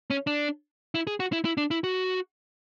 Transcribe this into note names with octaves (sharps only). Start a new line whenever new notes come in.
C#4
D4
E4
G#4
F#4
E4
E4
D4
E4
F#4